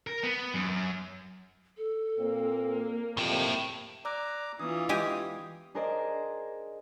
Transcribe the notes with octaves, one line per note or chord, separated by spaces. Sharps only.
A#4
B3
F#2
A4
A#2 A#3 C4
A#1 F2 A2 C3 G5
D5 A#5 D6 E6 F#6
E3 B3 D4 F4 D#6
G#3 G4 G#5 D#6
D4 G#4 A#4 C5 D5 D#5